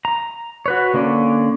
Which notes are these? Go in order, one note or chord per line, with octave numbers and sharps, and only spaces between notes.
A#5
F#4 B4 C#5
D3 A#3 C#4 D5